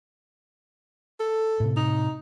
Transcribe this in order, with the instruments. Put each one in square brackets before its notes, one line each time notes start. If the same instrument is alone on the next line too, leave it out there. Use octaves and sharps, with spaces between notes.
[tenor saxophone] A4
[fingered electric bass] A2 C3
[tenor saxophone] D#4